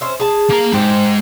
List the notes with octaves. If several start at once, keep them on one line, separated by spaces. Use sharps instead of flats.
C#4 C5 E5
G#4 A5
A#3 A#5
G#2 G4 C5